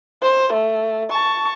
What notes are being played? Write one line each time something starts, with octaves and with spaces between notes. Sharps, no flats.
C5
A3
A5 C#6